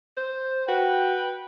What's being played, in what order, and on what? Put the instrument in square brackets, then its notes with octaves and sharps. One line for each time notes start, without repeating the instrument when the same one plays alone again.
[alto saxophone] C5
[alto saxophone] F#4 [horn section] B4 G5